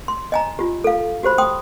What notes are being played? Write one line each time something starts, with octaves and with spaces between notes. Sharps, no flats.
C6
D#5 G#5 A#5
F4 G4
A4 F5
F#4 G4 C5 B5
G5 C6 D#6